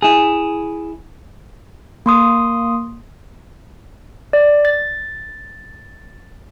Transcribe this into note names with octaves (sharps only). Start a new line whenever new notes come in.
E4 G#4
A#3 C6 D#6
D5
A6